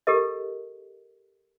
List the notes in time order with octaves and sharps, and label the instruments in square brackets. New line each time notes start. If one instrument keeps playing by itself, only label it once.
[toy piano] G4 A4 A#4 D#5